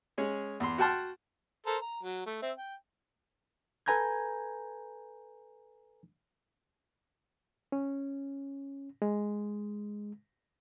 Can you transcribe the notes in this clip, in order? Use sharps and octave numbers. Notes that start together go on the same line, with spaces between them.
G#3 C#4 G#4
E2 C6
F#4 F#5 G5 A5 C6 F6
A4 A#4 C5
A#5
F#3
A3
C4 E5
G5
A4 B4 G#5 A#5 G6 G#6
C#4
G#3